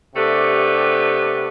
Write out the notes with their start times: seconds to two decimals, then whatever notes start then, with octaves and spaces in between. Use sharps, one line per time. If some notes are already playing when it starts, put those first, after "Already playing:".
0.16 C3 A3 B3 D4 G4